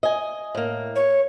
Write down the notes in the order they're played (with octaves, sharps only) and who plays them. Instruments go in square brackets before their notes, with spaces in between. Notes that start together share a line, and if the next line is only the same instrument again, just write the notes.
[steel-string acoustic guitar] D#5 G#5
A2 A#3
[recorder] C#5